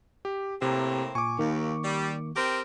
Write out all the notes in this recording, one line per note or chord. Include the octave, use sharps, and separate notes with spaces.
G4
A2 C3 A#3 C4
A#2 G#5 C#6 D6
D#2 D#3 A#3
G3
C4 G4 A#4